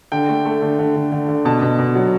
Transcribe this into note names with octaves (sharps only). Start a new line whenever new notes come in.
D3 G5
A3
A3
D3
D3
D3
D3
D3
B2 A5
B2
B2
F#3